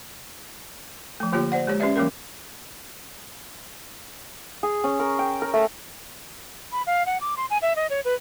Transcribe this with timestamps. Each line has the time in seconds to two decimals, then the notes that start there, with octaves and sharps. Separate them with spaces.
1.20 F3 A3
1.33 D3 A#3 F4 G4 C#5
1.52 C5 D5 F#5
1.67 G#3 G4 C#5
1.80 C#4 G4 B4 D5 E5
1.96 E3 G3 A#3 C#4 A#4
4.63 G#4
4.84 C#4
5.00 A#4
5.19 G5
5.42 A#4
5.54 A3
6.72 B5
6.87 F5
7.06 F#5
7.21 D6
7.37 C6
7.50 G#5
7.62 E5
7.76 D#5
7.90 C#5
8.05 B4